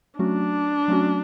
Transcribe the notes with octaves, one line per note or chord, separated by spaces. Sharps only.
F#3 A3 C#4 D4 F#4
F#3 A3 C#4 F#4